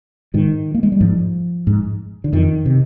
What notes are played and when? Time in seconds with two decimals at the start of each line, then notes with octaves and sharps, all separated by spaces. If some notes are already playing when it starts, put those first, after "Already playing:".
0.34 G#2 D#3
0.74 A#3
0.83 G#3
0.92 G3
1.01 G#2 F3
1.67 G#2
2.24 D3
2.33 F2 D#3
2.66 C3